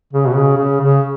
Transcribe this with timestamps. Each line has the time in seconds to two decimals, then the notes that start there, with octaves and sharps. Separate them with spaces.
0.13 C#3
0.27 B2
0.35 C#3
0.58 C#3
0.81 C#3